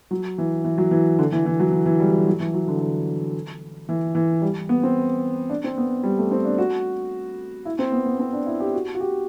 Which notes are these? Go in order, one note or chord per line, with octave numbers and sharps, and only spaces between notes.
F#3
E3
E3
F#3
E3
D3
E3
E3
F#3
E3
E3
G3
G3
F#3
E3
F#3
D3
D3
E3
E3
G3
B3
C4
D4
C4
B3
G3
A3
C4
D4
F#4
E4
C4
B3
B3
C4
D4
E4
G4
F#4
F#4
G4